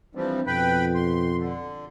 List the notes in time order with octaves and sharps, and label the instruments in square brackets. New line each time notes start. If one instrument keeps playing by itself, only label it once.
[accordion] E3 F3 G3 [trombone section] C4 D4
[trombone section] F2 B2 [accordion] B4 G5 B5
[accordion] C6
D3